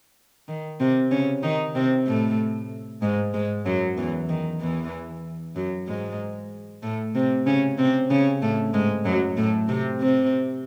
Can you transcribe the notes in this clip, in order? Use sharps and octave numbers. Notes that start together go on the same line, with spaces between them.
D#3
C3 C4
C#3 C#4
D#3 D#4
C3 C4
A2 A3
G#2 G#3
G#2 G#3
F#2 F#3
E2 E3
D#3
E2 E3
F#2 F#3
G#2 G#3
A2 A3
C3 C4
C#3 C#4
C3 C4
C#3 C#4
A2 A3
G#2 G#3
F#2 F#3
A2 A3
C3 C4
C3 C4